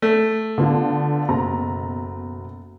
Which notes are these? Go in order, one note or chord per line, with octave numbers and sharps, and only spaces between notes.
A3
D3 B3 F4
F#1 B2 A#5